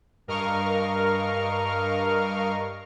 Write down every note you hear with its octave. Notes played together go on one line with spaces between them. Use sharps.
G2 A#4 D#5 F5 C#6 F6